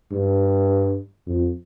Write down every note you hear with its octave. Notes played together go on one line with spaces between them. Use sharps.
G2
F2